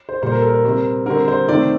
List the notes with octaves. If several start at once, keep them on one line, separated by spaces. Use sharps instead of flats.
C5
A#2 G3 A#3 C5
A#4
A4
A#4
C3 G3 C4
D3 G3 C4 A#4
C5
C3 D#3 A3 C4 D5